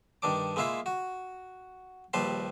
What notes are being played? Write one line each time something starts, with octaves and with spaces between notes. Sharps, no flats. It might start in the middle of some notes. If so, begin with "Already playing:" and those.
G2 D#3 D4 D6
G#3 A#3 E4 F4 E5 F5
F#4
A#1 D#2 G3 B4 A5 C6